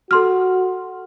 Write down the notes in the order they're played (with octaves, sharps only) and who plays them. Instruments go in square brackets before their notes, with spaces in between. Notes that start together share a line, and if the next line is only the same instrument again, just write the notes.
[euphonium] F#4 [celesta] A4 C6 F6